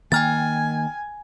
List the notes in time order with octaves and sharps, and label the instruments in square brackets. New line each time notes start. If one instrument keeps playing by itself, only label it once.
[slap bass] D#3 A#3 [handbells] G5 F6 A6 [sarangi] G#5